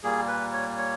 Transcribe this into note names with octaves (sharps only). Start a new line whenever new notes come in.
A#2 G3 A#3 G#4
B4
C#5
C#5